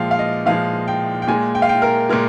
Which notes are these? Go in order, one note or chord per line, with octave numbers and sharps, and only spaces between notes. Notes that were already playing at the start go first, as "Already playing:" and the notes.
Already playing: A#2 F3 G#3 F5 G5
F5
D#5
A#2 F3 G#3 F5
G5
G5
A#2 G#3 G#5
G5
F5
G5
A#4
A#2 G#3 A#4